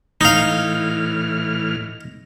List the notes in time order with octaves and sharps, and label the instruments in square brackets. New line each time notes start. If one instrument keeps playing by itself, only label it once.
[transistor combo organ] A2 E3 F6 [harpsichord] D#4 F5